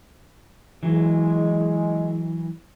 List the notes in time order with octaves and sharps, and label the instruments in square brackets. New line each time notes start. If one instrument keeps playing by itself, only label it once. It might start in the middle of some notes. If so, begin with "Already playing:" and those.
[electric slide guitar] E3 F#3 [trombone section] G#3